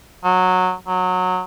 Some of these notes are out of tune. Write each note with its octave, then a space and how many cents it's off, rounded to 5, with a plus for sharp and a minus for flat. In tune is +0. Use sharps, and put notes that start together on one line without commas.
F#3 -10
F#3 -15